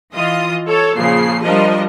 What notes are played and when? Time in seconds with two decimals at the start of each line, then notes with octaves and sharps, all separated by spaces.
0.14 E3 F4 D#5 D#6
0.66 A4 C#5
0.97 A#2 C#3 F3 C7
1.44 F3 G3 D4 A#4 D#5